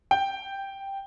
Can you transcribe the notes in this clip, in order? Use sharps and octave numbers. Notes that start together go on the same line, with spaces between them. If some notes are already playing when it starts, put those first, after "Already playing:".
G5